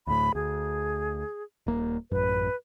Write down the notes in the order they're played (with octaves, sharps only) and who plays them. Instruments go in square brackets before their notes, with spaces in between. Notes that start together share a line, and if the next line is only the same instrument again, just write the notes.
[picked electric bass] D2 A2 [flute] B5
[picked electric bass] D2 [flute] G#4
[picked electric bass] D#1 A#3
[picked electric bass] A1 F#2 [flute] B4